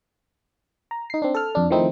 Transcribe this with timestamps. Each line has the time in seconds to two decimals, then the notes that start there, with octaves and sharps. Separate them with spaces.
0.91 A#5
1.10 D#4 C7
1.22 C4 D4
1.34 A4 F6
1.55 F2 D4
1.71 D#3 F3 A3 C4 D#4 E4